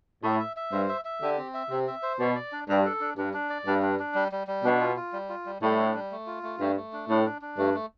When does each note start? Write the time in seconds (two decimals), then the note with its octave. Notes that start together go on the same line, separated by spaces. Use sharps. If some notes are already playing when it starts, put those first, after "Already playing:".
0.24 A2 E5
0.39 E5
0.56 E5
0.72 G2 C5
0.89 E5
1.05 E5
1.22 D3 G4
1.37 C4
1.54 E5
1.70 C3 C4
1.87 E5
2.03 C5
2.19 B2 D5
2.35 D5
2.52 D4
2.68 G2 D4
2.85 A4
3.00 D4
3.17 G2 D4
3.33 D4
3.50 D5
3.66 G2 D4
3.83 D4
3.99 D4
4.15 G3
4.32 G3
4.47 G3
4.64 B2 D4
4.81 F4
4.96 F4
5.13 G3
5.29 F4
5.46 G3
5.62 A2 G3
5.78 D4
5.94 G3
6.11 A3
6.27 F4
6.43 A3
6.60 G2 A3
6.76 A3
6.93 D4
7.09 A2 D4
7.25 D4
7.42 D4
7.58 G2 A3
7.74 A3